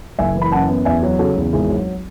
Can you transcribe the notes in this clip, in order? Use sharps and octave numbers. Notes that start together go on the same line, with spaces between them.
F#1 E5 G#5
E3
B5
F#2 F#5 A5
B3
E2 E5 G#5
F#3
C#3 F#4 A4
E2
G#1 E4 G#4
F#3